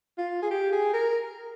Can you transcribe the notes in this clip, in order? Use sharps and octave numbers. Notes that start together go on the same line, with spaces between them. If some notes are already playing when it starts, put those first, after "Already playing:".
F4
G#4
G4
G#4
A#4